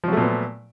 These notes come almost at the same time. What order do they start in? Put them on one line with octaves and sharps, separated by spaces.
F3 F#3 A3 A#2 B3